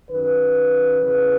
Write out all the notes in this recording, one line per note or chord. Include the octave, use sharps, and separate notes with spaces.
F#2 D#3 B4
E2 C#3 E3